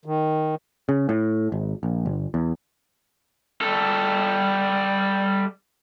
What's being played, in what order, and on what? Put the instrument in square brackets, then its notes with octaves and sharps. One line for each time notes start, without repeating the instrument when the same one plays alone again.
[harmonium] D#3
[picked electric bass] C#3
A2
G#1
A#1
G1
E2
[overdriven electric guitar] G3 A4